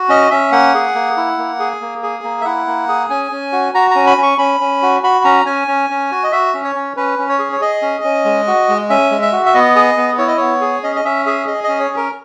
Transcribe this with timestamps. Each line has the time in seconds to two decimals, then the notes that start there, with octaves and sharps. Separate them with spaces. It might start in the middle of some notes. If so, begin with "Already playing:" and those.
Already playing: F#4
0.09 C#4 D#5
0.31 C#4 E5
0.52 A#3 F#5
0.74 G#4
0.95 A#3
1.17 E4
1.38 A#3
1.59 G#4
1.81 A#3
2.03 G#4
2.23 A#3
2.41 E5
2.45 E4 F#5
2.67 A#3
2.88 G#4
3.10 C#4 G#5
3.32 C#4
3.52 F#4
3.74 F#4 A#5
3.91 C#4 A#5
4.07 B5
4.18 C#4
4.23 C#6
4.38 C#4 B5
4.60 C#4
4.82 F#4
5.03 F#4 B5
5.24 C#4 A#5
5.46 C#4 G#5
5.68 C#4
5.90 C#4
6.11 F#4
6.24 D#5
6.32 F#4 E5
6.54 C#4
6.64 C#5
6.75 C#4
6.96 C#4 B4
7.19 C#4
7.29 C#5
7.39 G#4
7.52 C#5
7.61 G#4 D#5
7.82 C#4
8.04 C#4
8.25 G#3
8.47 F#4
8.69 G#3
8.90 C#4 E5
9.11 G#3
9.22 E5
9.33 F#4
9.46 E5
9.54 B3 D#5
9.76 G#4
9.97 B3
10.18 E4 C#5
10.28 D#5
10.37 B3 C#5
10.61 G#4
10.83 C#4 D#5
10.96 D#5
11.05 C#4 E5
11.26 G#4 E5
11.47 G#4 D#5
11.64 C#4 D#5
11.80 C#5
11.91 C#4
11.96 A#4